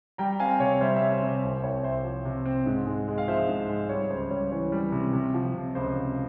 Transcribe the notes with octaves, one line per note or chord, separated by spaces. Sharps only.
G3 G5 A#5
C4 F5 G#5
C3 C#5
G3 C5 E5
C5 E5
C3
C5 E5
C3 C#5
C2 C5
C2 C#5
C2 C5 E5
F3
C3
C4
G#2
G#3
G#3
F5
F3 C5 E5
G#2
G#3
G3 C#5
C#2 C5
G3 C#5
E3 C#5
G3
C3
C3
F3
C3
C#2 C5
C3